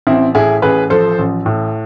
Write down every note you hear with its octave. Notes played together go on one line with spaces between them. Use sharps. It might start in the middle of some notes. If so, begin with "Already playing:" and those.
A1 C4 E4
A2 E4 G#4
A1 G#4 B4
F3 A4 C5
A1
A2